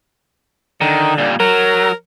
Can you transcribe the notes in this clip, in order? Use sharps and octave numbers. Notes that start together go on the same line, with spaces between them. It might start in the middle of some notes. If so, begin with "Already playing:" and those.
D3 D#3
A#2 G3
F#3 A#4